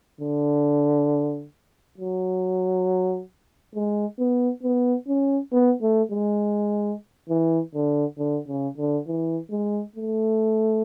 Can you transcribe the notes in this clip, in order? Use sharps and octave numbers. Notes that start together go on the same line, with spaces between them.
D3
F#3
G#3
B3
B3
C#4
B3
A3
G#3
E3
D3
D3
C#3
D3
E3
G#3
A3